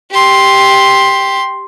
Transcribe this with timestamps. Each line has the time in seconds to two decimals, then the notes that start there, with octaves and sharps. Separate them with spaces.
0.11 G4 C6